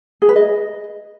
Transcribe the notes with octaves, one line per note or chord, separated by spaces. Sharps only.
G#4
B4
D#5